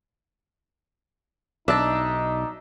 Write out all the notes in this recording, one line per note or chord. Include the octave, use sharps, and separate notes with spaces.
B1 D4 D#4 D#5 E5 A5